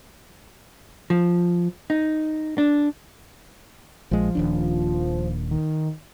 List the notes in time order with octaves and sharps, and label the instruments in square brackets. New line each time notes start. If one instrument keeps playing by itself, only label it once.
[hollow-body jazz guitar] F3
D#4
D4
[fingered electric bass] A#1 G#3 [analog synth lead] F3
[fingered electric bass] D#1 D#2 D4
[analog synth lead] D#3